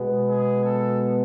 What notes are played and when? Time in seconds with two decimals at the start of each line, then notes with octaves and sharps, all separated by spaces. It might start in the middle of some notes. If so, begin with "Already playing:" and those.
Already playing: B2 G#3 B3
0.27 G#4
0.65 A4